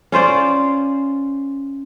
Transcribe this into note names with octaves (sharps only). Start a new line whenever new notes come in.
C#4 F4 C5 D5